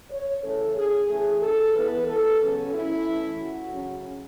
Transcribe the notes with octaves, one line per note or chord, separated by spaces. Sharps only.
C#5
C#3 E3 A3 C#4 A4
G#4
E3 A3 C#4 G#4
A4
E3 B3 B4
A4
C#3 F#3 B3 C#4
E4
E3 A3 C#4
F#4
C#3 F#3 C#4